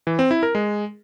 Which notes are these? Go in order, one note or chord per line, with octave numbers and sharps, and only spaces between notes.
E3
C4
E4
A#4
G#3